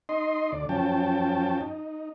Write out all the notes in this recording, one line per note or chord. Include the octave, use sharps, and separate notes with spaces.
D#4 D#5 C6
D2 D5
F#2 F3 C#4 G5 A5
D#4